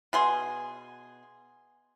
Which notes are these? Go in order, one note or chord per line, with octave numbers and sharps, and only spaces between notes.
B2 G#4 C6